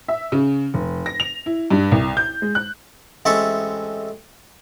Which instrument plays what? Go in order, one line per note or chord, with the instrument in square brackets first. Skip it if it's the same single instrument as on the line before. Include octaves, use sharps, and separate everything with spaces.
[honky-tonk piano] E5
C#3
F1
A#6
F7
E4
G2
C2
G6
G#3
F#6
[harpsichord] A1 G#3 C4 A4 E5 C#6